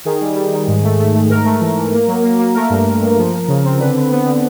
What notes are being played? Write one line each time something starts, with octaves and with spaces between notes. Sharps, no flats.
D#3 G#4
G3
G3
D#3
G#2
A3
A3
A3
G#2 A#4
A3
E3
E3
A#3
F#3
A#3
A#3
A3 A#4
G2
G2
G2
F3
F3
C#3
C4
D3 B4
D3
B3
D3